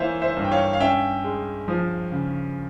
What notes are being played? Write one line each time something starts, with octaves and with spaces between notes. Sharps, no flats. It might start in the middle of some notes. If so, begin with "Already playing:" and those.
Already playing: E3 A#3 C5 C#5 E5 F5
C5 E5
G2
G5
C#5 F5
F5
C#4 E5 G5
G#3
F3
C#3